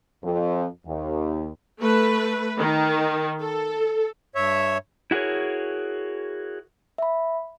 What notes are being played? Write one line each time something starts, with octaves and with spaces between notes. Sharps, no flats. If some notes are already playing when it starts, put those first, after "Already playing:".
F2
D#2
A3 B4
D#3
A4
G2 C#5 E5
E4 F#4 G#4 A#4 C#5
E5 B5